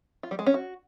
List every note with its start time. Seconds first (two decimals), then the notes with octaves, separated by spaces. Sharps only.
0.23 F4
0.31 G3
0.39 G#3
0.46 C#4
0.54 F#4